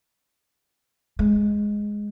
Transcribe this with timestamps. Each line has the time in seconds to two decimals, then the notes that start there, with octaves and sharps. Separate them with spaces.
1.19 G#3